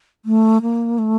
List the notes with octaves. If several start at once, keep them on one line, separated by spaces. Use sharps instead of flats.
A3
A#3
A3